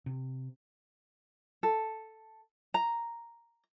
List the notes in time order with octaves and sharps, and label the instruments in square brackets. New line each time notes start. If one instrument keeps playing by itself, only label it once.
[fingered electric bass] C3
[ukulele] A4
A#5